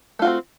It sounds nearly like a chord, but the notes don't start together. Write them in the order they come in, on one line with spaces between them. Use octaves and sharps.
A3 F4 F#4 C4